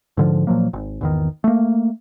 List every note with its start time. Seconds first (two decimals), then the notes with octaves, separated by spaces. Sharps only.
0.17 G#2 D3 F3
0.47 A#2 F3 F#3 A#3
0.73 G#1
1.01 G#1 E2 D#3
1.44 A3 A#3